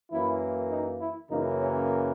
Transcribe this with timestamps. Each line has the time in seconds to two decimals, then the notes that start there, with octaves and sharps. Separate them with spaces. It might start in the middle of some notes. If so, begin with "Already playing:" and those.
0.11 F#2 E3 A#3 E4
0.71 D#4
1.00 E4
1.29 F#2 C#3 E3 A#3 D#4
1.60 C#4